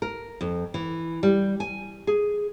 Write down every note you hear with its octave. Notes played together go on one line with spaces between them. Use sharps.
A#4
F2
E3
G3
G#5
G#4